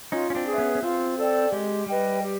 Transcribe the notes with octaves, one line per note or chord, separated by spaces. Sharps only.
C#4 D#4 F4
C#4
C4 D4
G#4 B4 E5
B3 C#4
C#4
C4 F4
A4 D5 G5
G#3 G4
G3 B4 D#5 G5
G4